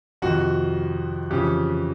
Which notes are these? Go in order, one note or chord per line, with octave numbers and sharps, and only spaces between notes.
F2 C3 D#3 F#4
F2 C#3 E3 G4